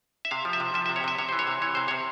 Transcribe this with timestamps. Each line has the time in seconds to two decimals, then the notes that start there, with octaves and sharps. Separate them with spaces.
0.25 E5
0.31 C3 F5
0.45 F3
0.53 E5
0.60 C3
0.74 F3 E5
0.86 E5
0.89 C3
0.96 C#5
1.04 C3 E5
1.18 C3 C#5
1.29 E3 C5
1.39 C#5
1.47 C3
1.62 E3 C#5
1.75 C3 C5
1.88 C3 C#5